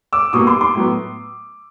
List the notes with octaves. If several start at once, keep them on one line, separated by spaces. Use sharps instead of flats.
D6 E6
B2 G3 A#3 C#6 D#6
C6 D6
C6 D6
A2 F#3 B3